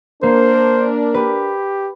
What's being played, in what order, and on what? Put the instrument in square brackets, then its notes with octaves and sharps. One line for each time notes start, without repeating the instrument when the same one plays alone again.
[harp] A#3 C7 [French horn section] D4 A#4 [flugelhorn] C5
[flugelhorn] G4 [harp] B4